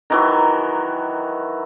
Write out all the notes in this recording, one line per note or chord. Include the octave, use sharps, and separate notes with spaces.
D#3 E3 F#3